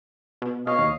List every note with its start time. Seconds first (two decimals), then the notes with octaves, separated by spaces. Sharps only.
0.42 B2
0.67 B2 C#5 D#5 F5
0.79 D#2